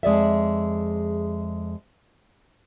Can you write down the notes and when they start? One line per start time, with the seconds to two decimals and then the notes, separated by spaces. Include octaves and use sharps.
0.03 F2 G#3 G#4 D5 E5